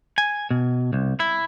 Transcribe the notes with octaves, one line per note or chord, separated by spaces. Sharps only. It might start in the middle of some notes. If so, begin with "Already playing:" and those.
G#5
B2
C2
E4